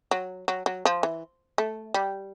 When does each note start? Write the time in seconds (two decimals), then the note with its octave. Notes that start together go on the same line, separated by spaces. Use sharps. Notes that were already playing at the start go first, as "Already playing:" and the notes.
0.11 F#3
0.48 F#3
0.66 F#3
0.85 F3
1.03 E3
1.58 A3
1.94 G3